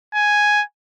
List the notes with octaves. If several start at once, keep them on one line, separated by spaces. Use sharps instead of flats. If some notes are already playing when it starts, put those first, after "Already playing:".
G#5